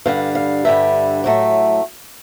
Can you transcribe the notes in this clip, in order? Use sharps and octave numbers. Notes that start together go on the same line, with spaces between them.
G2 D3 G3 F5
F5
G2 D3 G3 E5
A2 F#3 A3